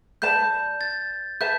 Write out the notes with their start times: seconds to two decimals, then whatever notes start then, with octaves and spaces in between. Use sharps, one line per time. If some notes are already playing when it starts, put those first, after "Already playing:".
0.22 B4 D5 A5 G6
0.81 A6
1.40 B4 E5 A5 G6